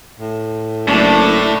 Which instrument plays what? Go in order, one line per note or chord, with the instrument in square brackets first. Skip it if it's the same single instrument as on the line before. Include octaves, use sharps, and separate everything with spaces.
[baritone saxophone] A2
[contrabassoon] F#1 [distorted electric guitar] A2 [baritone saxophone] A3 [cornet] D4